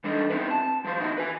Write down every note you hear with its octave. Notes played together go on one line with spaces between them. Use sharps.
E3 G3 D4 D#4 A4 D#5
B3 C4 D#4 E4 B4
A5
F3 F#3 F4 C5
A#2 D#4 E4 F#4
B4 G#5